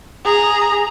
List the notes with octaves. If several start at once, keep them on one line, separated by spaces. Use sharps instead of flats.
G#4 A#5